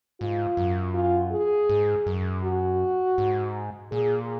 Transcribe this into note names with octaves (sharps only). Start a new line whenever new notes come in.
G#2 F4
F#2
F4
G#4
G#2
F#2
F#4
G#2
A#2 G#4